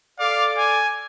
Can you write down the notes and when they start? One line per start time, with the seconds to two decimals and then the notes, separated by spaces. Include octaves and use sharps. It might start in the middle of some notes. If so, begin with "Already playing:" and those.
0.19 A4 D5 F5 D6
0.58 G#5